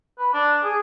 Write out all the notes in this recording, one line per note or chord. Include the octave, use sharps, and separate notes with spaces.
B4
D4
G#4